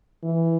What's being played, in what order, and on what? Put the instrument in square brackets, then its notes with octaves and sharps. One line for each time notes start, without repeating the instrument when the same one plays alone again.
[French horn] E3